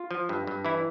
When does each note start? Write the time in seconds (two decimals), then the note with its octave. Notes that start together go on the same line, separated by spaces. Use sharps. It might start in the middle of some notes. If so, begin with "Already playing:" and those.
Already playing: F4
0.11 F3
0.29 G2
0.47 G2
0.65 E3 E4